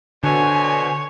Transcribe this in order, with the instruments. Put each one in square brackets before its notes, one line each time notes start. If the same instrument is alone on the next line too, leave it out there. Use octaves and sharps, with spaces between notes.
[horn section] B2 D4 C5 [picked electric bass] D3 [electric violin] C#5 [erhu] G#5